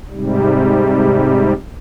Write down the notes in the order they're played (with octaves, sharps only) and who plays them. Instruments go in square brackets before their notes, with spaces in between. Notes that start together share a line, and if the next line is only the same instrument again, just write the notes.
[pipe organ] G#2 C3 G3